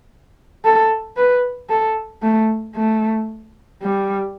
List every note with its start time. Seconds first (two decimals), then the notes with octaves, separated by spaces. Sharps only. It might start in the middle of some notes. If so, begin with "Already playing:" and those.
0.65 A4
1.17 B4
1.70 A4
2.22 A3
2.75 A3
3.82 G3